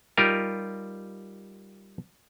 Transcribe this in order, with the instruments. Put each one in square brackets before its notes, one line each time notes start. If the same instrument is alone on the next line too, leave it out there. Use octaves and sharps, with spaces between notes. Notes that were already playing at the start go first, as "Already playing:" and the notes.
[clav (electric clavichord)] G3 D#4 F4 G4 A#4